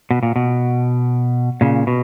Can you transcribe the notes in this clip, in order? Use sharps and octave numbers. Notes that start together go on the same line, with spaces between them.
B2
A#2
B2
A#2 C#3
B2